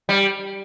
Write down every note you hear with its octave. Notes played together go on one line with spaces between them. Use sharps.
G3